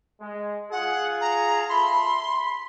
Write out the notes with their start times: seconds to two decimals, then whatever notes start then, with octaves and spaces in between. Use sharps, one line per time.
0.20 G#3
0.72 F4 G#4 F#5
1.21 A#5
1.69 A4 E5 B5 C6
2.28 B5